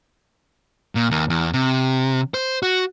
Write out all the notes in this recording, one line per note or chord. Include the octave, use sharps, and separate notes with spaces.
A#2
D#2
E2
C3
C5
F#4